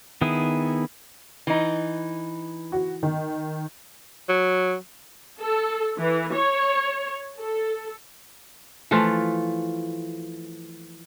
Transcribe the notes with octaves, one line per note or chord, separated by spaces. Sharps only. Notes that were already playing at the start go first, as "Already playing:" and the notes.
D#3 B3 E4 G#4
E3 D#4
F#4
D#3
F#3
A4
E3
C#5
A4
E3 F3 A3 F4